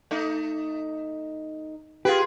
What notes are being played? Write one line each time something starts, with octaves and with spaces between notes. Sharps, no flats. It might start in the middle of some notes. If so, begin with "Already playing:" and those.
A3 D#4
F4 G4 G#4 B4